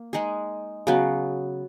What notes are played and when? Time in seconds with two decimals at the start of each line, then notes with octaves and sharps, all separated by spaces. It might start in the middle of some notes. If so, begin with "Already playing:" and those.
Already playing: A#3
0.13 G#3 D#4 G#4
0.87 C#3 F#3 B3